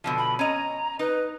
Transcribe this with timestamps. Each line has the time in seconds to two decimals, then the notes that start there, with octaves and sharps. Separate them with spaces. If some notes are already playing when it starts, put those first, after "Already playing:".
0.04 B2 D3 F3
0.18 B5
0.39 C#4 D#5 A#5
0.99 D#4 B4